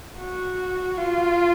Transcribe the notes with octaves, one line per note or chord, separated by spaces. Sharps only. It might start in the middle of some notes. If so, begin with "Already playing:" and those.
F#4
F4